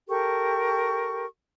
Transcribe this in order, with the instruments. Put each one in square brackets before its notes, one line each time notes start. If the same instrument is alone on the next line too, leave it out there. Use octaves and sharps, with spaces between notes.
[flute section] G4 A4 A#4 C#6